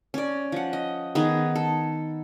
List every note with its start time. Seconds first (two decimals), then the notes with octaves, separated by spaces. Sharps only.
0.14 C#4 D5
0.52 F3 F#5
0.73 D#5
1.15 D#3 B3 G#4
1.55 A4